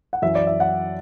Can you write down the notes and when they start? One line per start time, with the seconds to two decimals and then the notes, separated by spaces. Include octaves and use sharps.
0.13 F#5
0.22 F#2 E3 E5
0.35 D5
0.47 E5
0.60 F#5